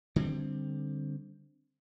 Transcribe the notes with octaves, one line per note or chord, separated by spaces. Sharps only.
D3 G3 B3 C4